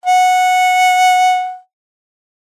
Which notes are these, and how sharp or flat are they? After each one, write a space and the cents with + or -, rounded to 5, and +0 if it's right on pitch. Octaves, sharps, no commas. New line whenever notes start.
F#5 -10